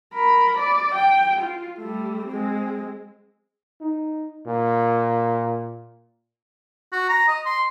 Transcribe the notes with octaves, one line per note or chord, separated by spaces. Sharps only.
A#4 B5
D5
G5
F4
G3 A3
G#3 C4
D#4
A#2
F#4
A#5
D#5
C6